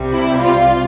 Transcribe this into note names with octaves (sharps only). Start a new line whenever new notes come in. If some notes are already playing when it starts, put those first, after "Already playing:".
Already playing: C2 C3 G3
E4
F4